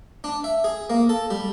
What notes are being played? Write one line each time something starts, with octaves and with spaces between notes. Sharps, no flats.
D4
E5
G#4
A#3
A4
G3